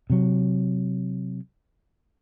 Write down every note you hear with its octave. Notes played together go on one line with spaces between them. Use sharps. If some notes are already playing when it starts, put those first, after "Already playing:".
C3 F#3